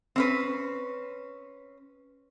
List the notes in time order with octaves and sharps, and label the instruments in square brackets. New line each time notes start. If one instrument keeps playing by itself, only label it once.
[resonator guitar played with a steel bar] C4 C#4 B4